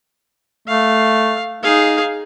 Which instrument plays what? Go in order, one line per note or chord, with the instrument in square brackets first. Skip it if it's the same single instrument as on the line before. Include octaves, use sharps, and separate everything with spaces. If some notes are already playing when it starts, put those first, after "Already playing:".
[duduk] A3 [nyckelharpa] F5
[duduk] D#4 [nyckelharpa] G#4 F5